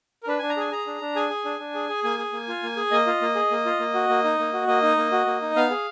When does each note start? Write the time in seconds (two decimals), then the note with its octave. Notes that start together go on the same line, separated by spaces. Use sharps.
0.23 A#4
0.27 D4 B4
0.39 D4 G#5
0.50 A#5
0.57 G#4 G#5
0.71 G#4 A#5
0.87 D4
1.01 D4
1.16 G#4 G#5
1.30 G#4
1.45 D4
1.59 D4
1.75 G#4
1.89 G#4
2.04 A#3 G#5
2.19 G#4
2.33 A#3
2.48 F4
2.63 A#3
2.77 G#4
2.91 A#3 D#5
3.07 F4
3.21 A#3
3.35 G#4
3.51 A#3
3.65 F4
3.80 A#3
3.94 F#4
4.09 A#3
4.24 D#4
4.39 A#3
4.53 F#4
4.67 A#3 D#5
4.82 D#4
4.97 A#3
5.12 F#4
5.26 A#3
5.42 D#4
5.56 B3 F5
5.70 G#4